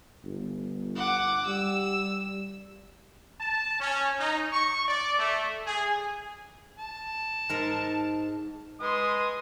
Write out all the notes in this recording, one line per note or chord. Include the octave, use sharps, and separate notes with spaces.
G1
F#5 D6
G3 E6
A5
C#4
D#4
C#6
D5
A3
G#4
A5
G#2 A#4
G#3 B4 C6 D#6